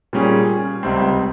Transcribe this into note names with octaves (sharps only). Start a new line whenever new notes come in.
A#2 G3 C#4 G#4
C#2 C3 G3 C4